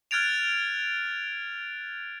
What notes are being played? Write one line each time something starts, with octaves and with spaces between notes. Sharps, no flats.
F6 F#6 G#6 A6 D7 F7